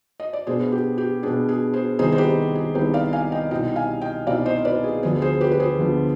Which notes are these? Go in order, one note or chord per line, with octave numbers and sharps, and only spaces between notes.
D#5
D5
B2 B3 D4 G#4 C5
G4
G4
B2 B3 D4 G#4
G#4
G#4 C5
C2 C3 D#3 B3 D#4 G#4 C5
C5
G4 B4
G#4
C2 C3 D#3 B3 D#4 G4 B4
D5 F5
F5 G#5
D#5 G5
C2 B2 G3 C4 D#4 D#5 G5
F5 G#5
D#5 G5
C2 B2 G3 C4 D#4 D5 F5
C5 D#5
C5
B4 D5
G#4
D2 D3 F3 B3 G#4
G#4 C5
G4 B4
B4
G#4 C5
D2 D3 F3 B3